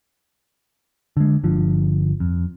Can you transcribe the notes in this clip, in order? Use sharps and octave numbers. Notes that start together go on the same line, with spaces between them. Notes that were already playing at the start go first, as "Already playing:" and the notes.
D3 G#3
G1 D3 F3
F2